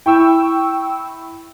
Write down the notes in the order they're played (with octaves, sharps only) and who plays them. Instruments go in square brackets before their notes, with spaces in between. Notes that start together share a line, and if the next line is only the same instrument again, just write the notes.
[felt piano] E4 [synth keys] G5 C#6 E6